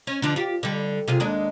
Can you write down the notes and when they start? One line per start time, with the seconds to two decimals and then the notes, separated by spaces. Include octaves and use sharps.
0.07 C#4
0.22 D3 F3 D4
0.36 F4 G4
0.63 D3 G3
1.08 C3 F4 G#4
1.20 D#2 G#3 D4